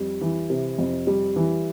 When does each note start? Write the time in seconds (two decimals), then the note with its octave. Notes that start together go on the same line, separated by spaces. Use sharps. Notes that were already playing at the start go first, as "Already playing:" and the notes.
Already playing: F2 G3
0.21 E3
0.50 C3
0.78 F2
1.07 G3
1.36 E3